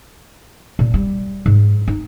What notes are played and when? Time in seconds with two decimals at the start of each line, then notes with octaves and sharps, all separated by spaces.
0.79 A#2
0.94 G3
1.46 G#2
1.88 D#4